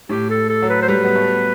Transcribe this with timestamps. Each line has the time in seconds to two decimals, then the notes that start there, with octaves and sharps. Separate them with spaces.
0.09 A2 G4
0.30 A4
0.49 A4
0.62 F#3
0.69 B4
0.82 C5
0.88 G3 B4
1.05 B3
1.15 A3